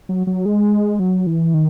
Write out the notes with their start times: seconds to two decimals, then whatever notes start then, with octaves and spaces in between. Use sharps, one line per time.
0.09 F#3
0.27 F#3
0.46 G#3
0.99 F#3
1.27 E3
1.54 D#3